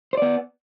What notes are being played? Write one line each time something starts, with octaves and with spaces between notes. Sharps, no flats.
B3 C5 D5